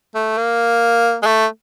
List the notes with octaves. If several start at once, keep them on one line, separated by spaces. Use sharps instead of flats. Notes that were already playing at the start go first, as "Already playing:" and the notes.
A3
A#3
G#3
A3